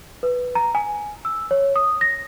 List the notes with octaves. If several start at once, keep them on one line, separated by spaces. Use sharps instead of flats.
B4
A#5
G#5
E6
C#5
D#6
A#6